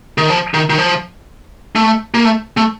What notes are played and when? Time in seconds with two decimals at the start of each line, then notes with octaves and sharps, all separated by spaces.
0.18 D#3
0.30 F3
0.54 D#3
0.70 D#3
0.78 F3
1.75 A3
2.14 A#3
2.25 A3
2.57 A3